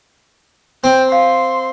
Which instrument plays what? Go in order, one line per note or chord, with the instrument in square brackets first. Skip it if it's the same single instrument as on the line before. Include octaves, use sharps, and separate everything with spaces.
[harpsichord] C4 [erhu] G5
[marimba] F5 [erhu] C6